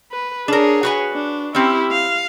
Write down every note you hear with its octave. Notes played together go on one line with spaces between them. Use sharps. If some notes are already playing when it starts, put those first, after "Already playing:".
B4
D4 G#4 A#4 C#5
F#4 B4 G#5
D4
C4 C#4 E4 G4
F5